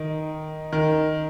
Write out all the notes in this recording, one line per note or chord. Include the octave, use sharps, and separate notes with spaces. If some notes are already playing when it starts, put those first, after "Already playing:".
Already playing: D#3
D#3